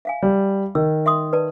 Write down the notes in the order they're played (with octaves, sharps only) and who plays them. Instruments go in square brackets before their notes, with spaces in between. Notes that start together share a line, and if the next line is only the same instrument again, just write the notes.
[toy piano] E5 F5 G#5
[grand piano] G3
[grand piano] D#3 [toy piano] E6
[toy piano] E5 C6 D#6
B4 D5 A5